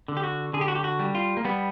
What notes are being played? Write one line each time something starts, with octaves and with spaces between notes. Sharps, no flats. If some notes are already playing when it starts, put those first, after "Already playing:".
D3
G4
F#4
D3 G#4
G4
F#4
G4
F#4
G3
F4
A#3
G3 B3